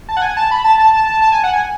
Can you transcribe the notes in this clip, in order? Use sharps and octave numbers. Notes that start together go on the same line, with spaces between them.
A5
F#5
G#5
A5
B5
A5
A5
A5
A5
A5
G#5
F#5
G#5